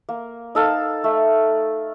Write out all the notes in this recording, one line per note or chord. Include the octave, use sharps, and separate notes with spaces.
A#3
D#4 A4 F5
A3